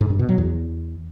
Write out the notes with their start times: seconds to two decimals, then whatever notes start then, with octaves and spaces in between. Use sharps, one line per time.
0.01 G#2
0.10 G2
0.19 B2
0.29 F#3
0.38 E2